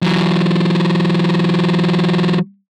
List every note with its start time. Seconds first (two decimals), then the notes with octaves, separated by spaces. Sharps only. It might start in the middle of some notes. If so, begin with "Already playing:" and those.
0.02 E3 F#3